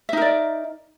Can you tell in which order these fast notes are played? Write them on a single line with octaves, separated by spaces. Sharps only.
E5 D#4 A#4 D5